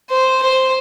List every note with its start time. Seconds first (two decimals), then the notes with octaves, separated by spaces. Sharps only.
0.10 C5
0.42 C5